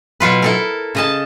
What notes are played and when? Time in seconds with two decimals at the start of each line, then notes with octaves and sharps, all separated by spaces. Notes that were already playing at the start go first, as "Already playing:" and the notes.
0.20 B2 F#3 F4 B4
0.42 E4 A4 A#4
0.95 C#3 D#5 A5